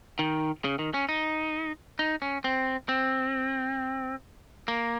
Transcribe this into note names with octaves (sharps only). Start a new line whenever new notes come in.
D#3
C#3
D#3
C#4
D#4
D#4
C#4
C4
C4
A#3